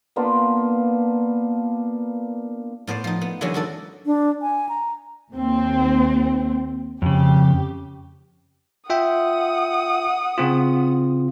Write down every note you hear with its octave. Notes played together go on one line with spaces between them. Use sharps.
A#3 B3 D4 F4
A2 B3 C5 D5
F3 D#4
B3
D3 E3 F#3 G#3 B3 C#4
D#3 F#4 A4 D5
D4
G#5
A#5
D#2 C4
F2 C#3 G4
F4 E5 F#5 G5 D#6
C#3 C4 F4